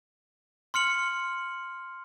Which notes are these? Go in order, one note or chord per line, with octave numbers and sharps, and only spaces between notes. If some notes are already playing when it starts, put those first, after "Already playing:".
C6 F6 C#7 F#7